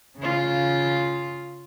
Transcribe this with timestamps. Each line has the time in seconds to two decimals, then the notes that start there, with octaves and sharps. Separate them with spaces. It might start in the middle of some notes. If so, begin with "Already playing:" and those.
0.18 C#3 F4